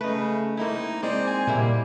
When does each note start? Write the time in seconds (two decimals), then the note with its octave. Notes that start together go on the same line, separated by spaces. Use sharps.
0.01 C#3 A3 D#4 B4
0.57 A#3 C4 D#4 E4
1.03 G#3 C4 D5
1.27 G#5
1.47 A#2 G3 A#3 E4